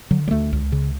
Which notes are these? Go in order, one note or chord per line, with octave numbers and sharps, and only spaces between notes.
D3 F#3
G3
D2 A3
C#2
C#3